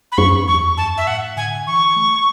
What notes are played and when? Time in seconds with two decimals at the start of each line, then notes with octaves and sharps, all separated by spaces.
0.12 B5
0.18 F#2 C#6
0.48 E2 C#6
0.77 F#2 A5
0.98 E5
1.07 A2 F#5
1.37 D3 G#5
1.67 E3 C#6
1.96 A3